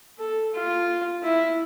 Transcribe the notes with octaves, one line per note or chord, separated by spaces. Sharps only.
A4
F4
E4